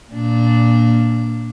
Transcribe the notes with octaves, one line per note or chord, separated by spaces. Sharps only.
A#2 D4